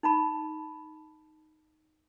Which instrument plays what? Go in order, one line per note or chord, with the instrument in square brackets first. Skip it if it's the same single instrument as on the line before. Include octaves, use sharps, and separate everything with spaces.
[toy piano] D#4 A5 B5